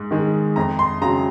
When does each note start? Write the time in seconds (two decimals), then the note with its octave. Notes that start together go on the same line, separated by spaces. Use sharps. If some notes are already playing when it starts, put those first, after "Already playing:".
Already playing: G#2
0.11 D#3 G#3
0.56 F2 A#5
0.79 C6
1.02 C#3 F#3 A#5